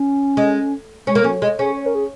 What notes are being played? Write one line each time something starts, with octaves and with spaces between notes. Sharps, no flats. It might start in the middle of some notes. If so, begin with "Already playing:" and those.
Already playing: C#4
G#3
G#3 C#4
A#3
F#3 C#4
G#3
C#4 G#4
C#5
A#4
G#4